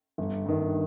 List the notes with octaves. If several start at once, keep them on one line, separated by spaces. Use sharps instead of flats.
G1
G2 D#3